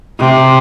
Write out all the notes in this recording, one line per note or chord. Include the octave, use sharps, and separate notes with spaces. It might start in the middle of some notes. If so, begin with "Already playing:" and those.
C3